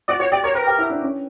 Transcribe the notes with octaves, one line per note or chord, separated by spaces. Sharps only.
F#4 D5
F#4 C#5
G4 D5
A#4 C#5
A#4 B4
G4
E4
D4
C#4